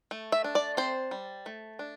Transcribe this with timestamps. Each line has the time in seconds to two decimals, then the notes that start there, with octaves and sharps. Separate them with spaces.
0.11 A3
0.32 E5
0.44 D4
0.55 D5
0.77 C4 C5
1.11 G3
1.46 A3
1.79 D4